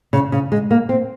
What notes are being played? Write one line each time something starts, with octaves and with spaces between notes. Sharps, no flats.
C#3
C#3
G#3
A#3
C4